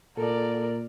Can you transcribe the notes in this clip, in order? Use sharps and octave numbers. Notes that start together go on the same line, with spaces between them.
A#2 A4 A#4 D5